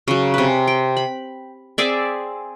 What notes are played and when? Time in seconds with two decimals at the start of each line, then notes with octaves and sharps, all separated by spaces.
0.08 C#3 F#3
0.34 C3 B4
0.67 G5
0.97 B5
1.78 C4 G#4 D5 E5